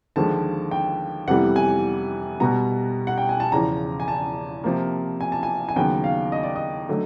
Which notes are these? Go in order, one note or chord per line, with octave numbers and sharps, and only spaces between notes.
D#2 D3 F3 G#3 A5
G5
F2 C3 E3 G3 B3 F#5
G#5
B2 G3 B3 A#5
F#5
G5
G#5
A5
E2 C#3 F3 A#5
G#5
A5
C3 F3 A#3
G#5
A5
G#5
G#5
D#2 C#3 F#3 B3 G5
F5
D#5
D5
D#5
D3 F#3 A3